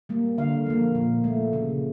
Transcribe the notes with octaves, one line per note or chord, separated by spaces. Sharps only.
G3 A#3
D3 F5
F3 A#3
A#2
A3
C#3